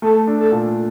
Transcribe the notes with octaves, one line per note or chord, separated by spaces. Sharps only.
A3 A4
D4
A4
A#2